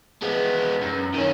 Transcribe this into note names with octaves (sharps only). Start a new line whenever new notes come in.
G#3 B3
F#2
D#3 C#4